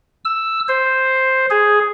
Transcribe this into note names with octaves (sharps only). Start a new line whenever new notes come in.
E6
C5
G#4